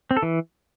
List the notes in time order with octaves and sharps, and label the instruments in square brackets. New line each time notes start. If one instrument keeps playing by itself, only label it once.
[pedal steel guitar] C4
A4
E3